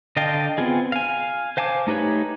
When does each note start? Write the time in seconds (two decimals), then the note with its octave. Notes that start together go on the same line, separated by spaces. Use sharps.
0.17 D3 D#5 F5 G5 A5
0.58 B3 C4 F4 G#4
0.92 F5 G#5
1.57 C5 F5 G#5 A5 D6
1.87 A3 D#4 G4 B4 C#5